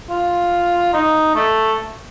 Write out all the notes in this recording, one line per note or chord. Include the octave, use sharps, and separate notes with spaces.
F4
D#4
A3